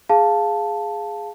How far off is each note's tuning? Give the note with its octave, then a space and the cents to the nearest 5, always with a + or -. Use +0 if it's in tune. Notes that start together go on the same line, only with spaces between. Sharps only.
G#4 +0 F5 +0 A5 +0